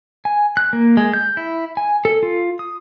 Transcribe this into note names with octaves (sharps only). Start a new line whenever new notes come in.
G#5
F#6
A#3
G#3
G6
E4
G#5
A4
F4
D#6